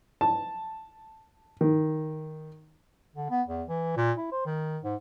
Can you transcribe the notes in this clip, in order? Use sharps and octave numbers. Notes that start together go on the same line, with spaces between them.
A5
D#3
D3
B3
E2
E3
A#2
E4
C5
D#3
G#2